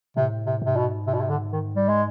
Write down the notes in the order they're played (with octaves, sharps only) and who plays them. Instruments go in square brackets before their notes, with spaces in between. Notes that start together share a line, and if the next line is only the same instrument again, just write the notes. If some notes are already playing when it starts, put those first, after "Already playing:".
[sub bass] A2 [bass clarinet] C3
[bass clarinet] C3
[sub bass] G#2 [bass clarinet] C3
[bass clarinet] B2
C3
B2
C3
D3
D#3
G3
G#3